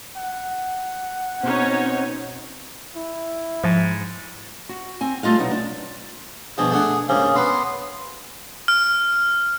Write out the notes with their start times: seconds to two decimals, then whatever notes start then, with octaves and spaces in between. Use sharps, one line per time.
0.16 F#5
1.43 B2 C4 C#4 D#4 C#5
2.96 E4
3.64 G#2 F3
4.69 F#4
5.01 C4 G#5
5.23 G3 A3 F4 D#5 F5
5.38 B2 F#3 D#4 E4
5.51 D4
6.58 G2 B2 F3 G#4
6.71 A3 D4 F#5
7.09 C#2 G2 C3 A#3 C#4 G#4
7.36 F#3 B3 B4 C6
8.68 F6